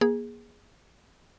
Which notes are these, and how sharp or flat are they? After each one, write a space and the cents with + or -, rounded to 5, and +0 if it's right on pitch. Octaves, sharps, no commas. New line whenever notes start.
A#3 +30 G#4 -10